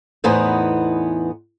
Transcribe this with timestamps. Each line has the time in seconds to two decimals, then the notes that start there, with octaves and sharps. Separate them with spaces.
0.24 E2 A2 E3 B3 D#4 C5